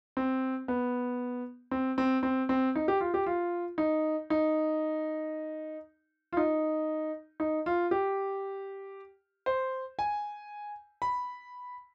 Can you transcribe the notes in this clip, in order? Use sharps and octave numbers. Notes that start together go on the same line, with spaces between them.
C4
B3
C4
C4
C4
C4
D#4
G4
F4
G4
F4
D#4
D#4
F4
D#4
D#4
F4
G4
C5
G#5
B5